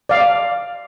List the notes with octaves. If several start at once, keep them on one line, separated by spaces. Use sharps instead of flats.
D5 F5